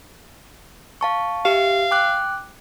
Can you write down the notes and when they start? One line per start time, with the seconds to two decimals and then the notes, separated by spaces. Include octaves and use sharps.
1.01 F5 A5 C#6
1.45 G4 E5 F5
1.91 G5 D6 F#6